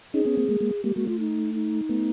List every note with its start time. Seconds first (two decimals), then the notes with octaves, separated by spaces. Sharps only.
0.14 C#4 D#4 G#4
0.25 B3 C#4
0.37 A#3 C4
0.49 G#3 A#3
0.60 G#3 A#3
0.84 G#3 A#3 G4
0.96 G#3 A#3 F#4
1.07 A3 F4
1.19 D#4
1.54 D#4
1.89 A3 B3